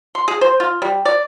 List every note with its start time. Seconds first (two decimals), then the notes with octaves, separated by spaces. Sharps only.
0.15 C6
0.28 G#4
0.41 C5
0.60 F4
0.82 G3
1.05 D5